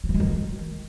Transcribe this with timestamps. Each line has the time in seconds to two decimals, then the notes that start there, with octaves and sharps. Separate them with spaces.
0.04 F#3
0.09 E3
0.15 G#3
0.20 D#3